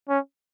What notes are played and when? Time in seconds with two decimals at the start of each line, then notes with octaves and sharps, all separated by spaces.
0.09 C#4